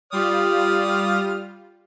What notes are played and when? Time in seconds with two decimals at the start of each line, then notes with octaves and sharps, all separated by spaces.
0.13 G3 F4 D5 D#6 F6